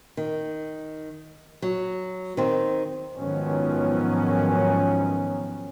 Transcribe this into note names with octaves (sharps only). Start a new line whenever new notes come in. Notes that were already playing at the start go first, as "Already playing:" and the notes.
D#3
F#3
D#3 C4
G#2 D#3 F3 F#3 B3 C#4